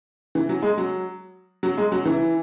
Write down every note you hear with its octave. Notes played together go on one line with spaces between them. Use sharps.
E3
F#3
G#3
F#3
F#3
G#3
F#3
E3